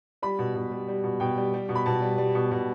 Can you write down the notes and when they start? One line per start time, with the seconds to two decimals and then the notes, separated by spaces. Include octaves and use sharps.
0.22 G3 B5
0.39 B2
0.55 B2
0.71 G3
0.88 G3
1.04 B2
1.20 B2 G5
1.37 G3
1.54 G3
1.69 B2
1.75 B5
1.86 B2 A5
2.02 G3
2.18 G3
2.35 B2
2.52 B2